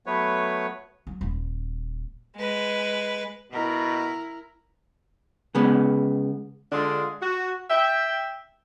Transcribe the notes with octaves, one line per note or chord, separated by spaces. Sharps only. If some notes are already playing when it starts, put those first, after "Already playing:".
F#3 A3 B3 B4 C#5
F#3
D#1
G#3 B4
B2 E4 A#4
C#3 G#3 B3
D3 G#3 D4 F4
F#4
E5 G5